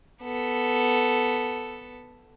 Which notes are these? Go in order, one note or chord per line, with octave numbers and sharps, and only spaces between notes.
B3 A4